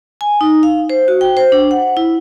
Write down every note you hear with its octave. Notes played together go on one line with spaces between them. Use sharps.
G#5
D#4
F5
C5
F#4
G5
C5
D4
F#5
E4